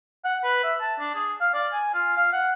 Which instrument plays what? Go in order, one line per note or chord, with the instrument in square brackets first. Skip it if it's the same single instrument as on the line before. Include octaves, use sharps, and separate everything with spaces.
[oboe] F#5
B4
E5
A5
D4
G#4
F5
D5
G#5
F4
F5
F#5